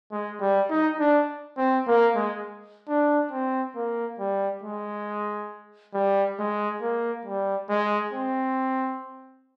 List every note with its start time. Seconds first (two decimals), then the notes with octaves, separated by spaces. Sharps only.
0.12 G#3
0.41 G3
0.70 D#4
1.00 D4
1.58 C4
1.87 A#3
2.16 G#3
2.89 D4
3.32 C4
3.76 A#3
4.20 G3
4.64 G#3
5.94 G3
6.39 G#3
6.82 A#3
7.26 G3
7.70 G#3
8.13 C4